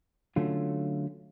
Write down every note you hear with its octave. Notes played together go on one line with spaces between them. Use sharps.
D3 F#3 A3 C#4 F4